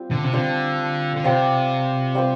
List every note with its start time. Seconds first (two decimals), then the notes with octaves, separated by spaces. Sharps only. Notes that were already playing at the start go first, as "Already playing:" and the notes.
Already playing: G3 C4 F4
0.11 D3
0.24 C3
0.33 D3 G3 C4 F4 C5
1.16 D3
1.24 C3 G3 C4 F4 C5
2.15 G3 C4 F4 C5